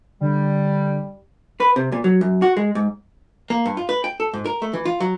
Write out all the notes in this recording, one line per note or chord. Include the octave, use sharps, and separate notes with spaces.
D3 G3
B4
C3
A#2
F#3
F#2
F#4
G#3
G#2
A#3
G2
F4
B4
G5
A4
G#2
A#4
A3
E3
F4
F#3